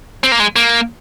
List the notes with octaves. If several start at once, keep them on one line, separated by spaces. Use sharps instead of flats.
C4
A#3
G#3
A#3